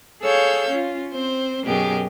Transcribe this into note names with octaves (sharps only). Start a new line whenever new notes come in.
G#4 A4 C#5 F5 E6 G6
C#4 F4
C4 C5
F#2 B2 G4 G#4 A#4